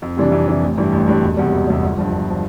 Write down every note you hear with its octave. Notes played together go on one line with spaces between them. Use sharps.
F2
C3 E3 G3 D4
F2
C3 E3 G3 D4
A1
G2 E3 G3
A1
G2 E3 G3
E1
E2 C3 G3
E1
E2 C3 G3
G1
G2 F3
G1
F3